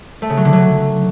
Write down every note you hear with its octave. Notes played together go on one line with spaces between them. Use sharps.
A3
C#3
F#3
D3
F#3